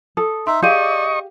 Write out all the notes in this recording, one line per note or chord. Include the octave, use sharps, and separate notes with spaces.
A4 D#6
D#4 E5 C6
G4 G#4 D5 D#5 F5 C#6 G6 D#7